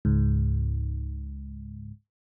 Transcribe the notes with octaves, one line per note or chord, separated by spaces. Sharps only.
C#2 G#2